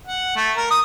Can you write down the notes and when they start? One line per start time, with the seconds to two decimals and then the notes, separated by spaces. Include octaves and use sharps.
0.07 F#5
0.36 A3
0.57 A#4
0.71 D#6